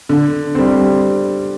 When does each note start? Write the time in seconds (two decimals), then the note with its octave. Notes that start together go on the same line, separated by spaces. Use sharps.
0.09 D3
0.55 G3 C4